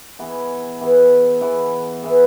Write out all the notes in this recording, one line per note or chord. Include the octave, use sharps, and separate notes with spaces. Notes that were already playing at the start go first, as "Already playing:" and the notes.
E3 B3 G#4
E3 B3 G#4
E3 B3 G#4
E3 B3 G#4